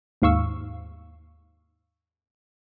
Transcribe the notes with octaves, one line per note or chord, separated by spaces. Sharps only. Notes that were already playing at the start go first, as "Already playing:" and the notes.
D#2 G#2 F5 C#6 E6